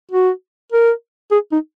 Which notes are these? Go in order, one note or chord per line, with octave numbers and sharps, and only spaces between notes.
F#4
A#4
G#4
D#4